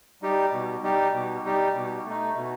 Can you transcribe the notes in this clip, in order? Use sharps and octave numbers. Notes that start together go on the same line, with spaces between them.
G3 D#4 G4
B2
G3 D#4 G4
B2
G3 D#4 G4
B2
A3 D#4
B2